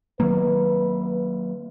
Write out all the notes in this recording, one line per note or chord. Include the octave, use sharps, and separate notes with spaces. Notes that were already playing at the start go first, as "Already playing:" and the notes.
D#3 F#3 A#3 B4